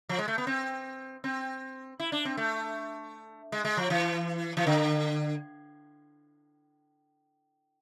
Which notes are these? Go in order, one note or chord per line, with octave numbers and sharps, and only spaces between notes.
F3
G#3
A3
B3
C4
C4
E4
D4
C4
A3
G#3
G#3
F3
E3
E3
D3